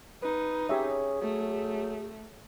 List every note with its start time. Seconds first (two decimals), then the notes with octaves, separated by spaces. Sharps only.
0.22 D#4 B4
0.69 C#4 G4 G#4 C#5 E5
1.22 F#3 A3